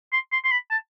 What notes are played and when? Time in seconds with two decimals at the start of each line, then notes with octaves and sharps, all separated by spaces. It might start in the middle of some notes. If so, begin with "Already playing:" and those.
0.13 C6
0.32 C6
0.45 C6
0.51 B5
0.71 A5